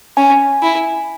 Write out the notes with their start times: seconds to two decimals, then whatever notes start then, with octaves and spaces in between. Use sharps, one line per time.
0.17 C#4 G#5
0.62 E4